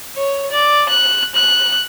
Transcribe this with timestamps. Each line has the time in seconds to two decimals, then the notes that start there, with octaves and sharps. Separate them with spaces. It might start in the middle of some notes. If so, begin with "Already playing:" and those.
0.17 C#5
0.51 D5
0.89 F#6
1.35 F#6